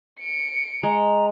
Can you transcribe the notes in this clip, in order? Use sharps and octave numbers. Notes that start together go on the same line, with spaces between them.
C#7 D7
G#3 A#5